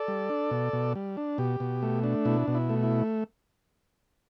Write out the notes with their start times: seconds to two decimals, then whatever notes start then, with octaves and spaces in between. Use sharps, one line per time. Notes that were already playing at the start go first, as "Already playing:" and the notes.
Already playing: A4 D5
0.08 G3
0.30 D4
0.51 B2
0.73 B2
0.95 G3
1.17 D4
1.38 B2 G4
1.60 B2
1.82 A3
2.04 D4
2.25 B2 E4
2.48 B2
2.55 E4
2.69 A3
2.83 E4